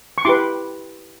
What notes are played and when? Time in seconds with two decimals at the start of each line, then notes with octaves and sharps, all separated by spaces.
0.18 C#6
0.25 E4 G4 B4 C6 D6